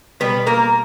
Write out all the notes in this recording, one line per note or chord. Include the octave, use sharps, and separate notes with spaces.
B2 G3 B3 B4
A#3 A#4